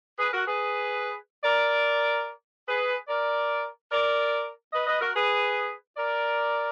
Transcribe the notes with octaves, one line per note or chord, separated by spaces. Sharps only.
G#4 B4
F#4 A#4
G#4 B4
A#4 D5
G#4 B4
A#4 D5
A#4 D5
B4 D#5
B4 D#5
F#4 A#4
G#4 B4
A#4 D5